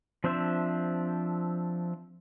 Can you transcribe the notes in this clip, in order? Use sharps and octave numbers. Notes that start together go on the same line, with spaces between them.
F3 C4 D4 C5 E5